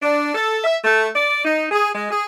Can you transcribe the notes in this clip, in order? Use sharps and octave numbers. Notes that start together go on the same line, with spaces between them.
D4
A4
E5
A3
D5
D#4
G#4
G#3
G#4